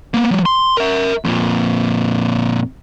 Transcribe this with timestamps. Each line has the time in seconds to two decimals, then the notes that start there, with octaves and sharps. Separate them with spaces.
0.14 A#3 B3
0.31 F3 G3
0.46 C6
0.77 A#4 E5
1.24 F2 A#2